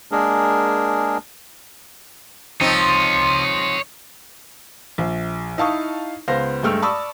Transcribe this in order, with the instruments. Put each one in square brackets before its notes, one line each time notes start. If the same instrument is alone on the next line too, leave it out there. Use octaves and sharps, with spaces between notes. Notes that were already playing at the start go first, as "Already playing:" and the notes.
[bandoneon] G#3 A#3 D4 G#4 A#4
[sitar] F3 C4 D#4 [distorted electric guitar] C#5 D#5
[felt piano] A#1
D#4 E4 F5 A5 C#6 D#6
C#2 B3 C5 F5 A#6
G2 G#3 A3 G5 E6 F6
D5 A5 B5 C#6 D#6 E6